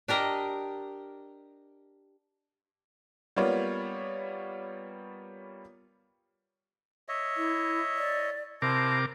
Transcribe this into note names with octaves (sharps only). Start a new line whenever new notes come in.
D4 G4 A#4 D#5
G3 A#3 B3 F4 C#5 D5
C#5 D#5 E5
E4
D5
C3 E4 A#4 C5 A5 D6